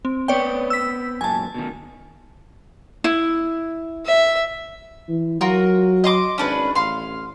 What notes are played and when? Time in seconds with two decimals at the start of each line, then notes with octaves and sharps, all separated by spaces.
0.05 C4
0.28 B3 C4 B4 C#5 D5 G5
0.70 E6 B6
1.21 F#2 A#2 G#5 A5
1.54 B2 D#3
3.04 E4
4.06 E5
5.09 E3
5.41 F#3 F4 F#4 A#4
6.04 D#5 C6 D6
6.38 G#1 C#4 D4 B4
6.75 A1 F5 C6